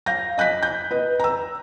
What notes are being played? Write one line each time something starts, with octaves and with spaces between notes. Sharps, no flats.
F5 G6 A#6
D#5 F#6 G6 B6
G6
B4 D#5
A#5 E6